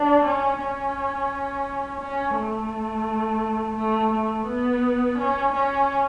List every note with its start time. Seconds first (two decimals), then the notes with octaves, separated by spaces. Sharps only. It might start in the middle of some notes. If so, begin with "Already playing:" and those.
Already playing: D4
0.24 C#4
0.59 C#4
2.00 C#4
2.35 A3
3.76 A3
4.12 A3
4.46 B3
5.17 C#4
5.53 C#4